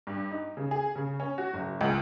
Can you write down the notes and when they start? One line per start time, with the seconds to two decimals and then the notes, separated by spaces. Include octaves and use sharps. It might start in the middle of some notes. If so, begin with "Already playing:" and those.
0.07 G2
0.31 D#4
0.57 C#3
0.71 G#4
0.96 C#3
1.20 C#4
1.38 F#4
1.54 F#1
1.81 C#2